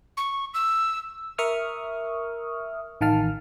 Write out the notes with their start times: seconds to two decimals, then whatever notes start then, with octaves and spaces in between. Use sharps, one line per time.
0.17 C#6
0.54 E6
1.38 A#4 E5 C#6 D#6 F6
3.01 A1 D#3 F5 A5 F6